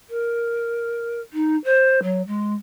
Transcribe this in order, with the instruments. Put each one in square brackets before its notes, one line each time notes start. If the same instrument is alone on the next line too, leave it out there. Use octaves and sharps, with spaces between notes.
[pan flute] A#4
D#4
C5
F#3
G#3